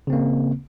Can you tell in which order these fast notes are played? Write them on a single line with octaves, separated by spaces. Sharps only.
C#3 C4 A#3